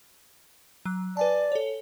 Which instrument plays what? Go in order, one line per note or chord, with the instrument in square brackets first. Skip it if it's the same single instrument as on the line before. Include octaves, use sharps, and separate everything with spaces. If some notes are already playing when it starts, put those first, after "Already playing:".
[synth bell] F#3 F#6
[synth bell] B4 G#5 A5 [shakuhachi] D5
[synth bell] A4 C#5